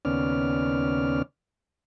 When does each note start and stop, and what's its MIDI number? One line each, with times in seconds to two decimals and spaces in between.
0.05 1.22 39
0.05 1.22 49
0.05 1.22 59
0.05 1.22 61
0.05 1.22 74
0.05 1.22 89